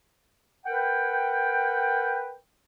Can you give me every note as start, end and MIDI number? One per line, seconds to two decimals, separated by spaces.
0.66 2.34 70
0.66 2.34 71
0.66 2.34 78
0.66 2.34 79